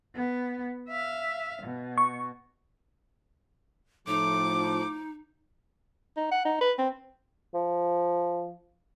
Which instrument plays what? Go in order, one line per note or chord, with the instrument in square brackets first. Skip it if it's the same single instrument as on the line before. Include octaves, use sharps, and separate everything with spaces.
[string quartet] B3
E5 F5
B2
[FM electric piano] C#6
[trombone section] A2 F3 [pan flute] D#4 [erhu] D6
[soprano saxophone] D#4
F#5
D#4
B4
C4
[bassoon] F3